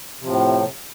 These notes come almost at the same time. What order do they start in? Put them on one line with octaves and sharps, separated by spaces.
C3 F3 A2